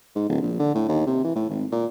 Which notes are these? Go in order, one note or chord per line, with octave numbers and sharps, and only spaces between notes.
G#2
D1
A#1
D3
A2
D#2
C3
E3
A2
G#1
A#2